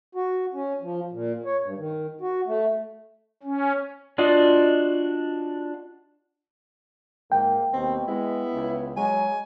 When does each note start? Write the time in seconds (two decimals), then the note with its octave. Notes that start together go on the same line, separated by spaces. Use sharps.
0.15 F#4
0.53 C#4
0.82 F3
1.12 A#2
1.45 C#5
1.63 G2
1.78 D#3
2.21 F#4
2.47 A3
3.43 C#4
4.18 D4 F4 F#4 D5 D#5
7.32 G#2 A#3 G5
7.73 D#2 B2 C4
8.07 G#3 B3 E4
8.53 C#2
8.96 F#3 G#3 G#5